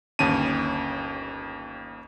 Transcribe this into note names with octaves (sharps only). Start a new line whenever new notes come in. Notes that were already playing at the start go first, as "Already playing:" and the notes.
G1 D#2 C#4 A5 D#7